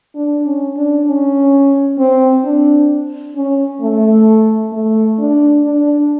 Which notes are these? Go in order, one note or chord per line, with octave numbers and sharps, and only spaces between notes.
D4
C#4
D4
C#4
C4
D4
C#4
A3
A3
D4
D4